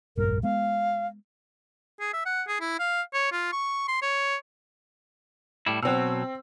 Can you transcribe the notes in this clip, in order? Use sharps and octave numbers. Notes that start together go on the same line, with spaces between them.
F1 A#1 G2 A#4
G#3 B3 F5
G#4
E5
F#5
G#4
E4
F5
C#5
F4
C#6
C6
C#5
A2 G3 E4
B2 F#3 C4 E6